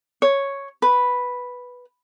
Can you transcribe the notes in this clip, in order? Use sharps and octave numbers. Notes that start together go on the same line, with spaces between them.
C#5
B4